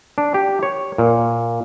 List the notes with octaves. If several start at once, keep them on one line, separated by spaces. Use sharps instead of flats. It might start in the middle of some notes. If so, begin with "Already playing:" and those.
D4
G4
C#5
A#2